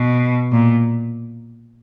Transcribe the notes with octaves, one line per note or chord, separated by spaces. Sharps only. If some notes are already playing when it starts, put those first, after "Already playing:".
Already playing: B2
A#2